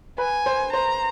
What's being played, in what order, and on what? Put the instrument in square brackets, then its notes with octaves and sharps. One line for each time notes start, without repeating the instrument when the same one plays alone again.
[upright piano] B4 [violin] G#5
[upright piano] C5
[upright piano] C5 [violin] A#5